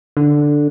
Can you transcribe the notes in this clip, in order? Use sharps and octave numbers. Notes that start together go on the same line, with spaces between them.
D3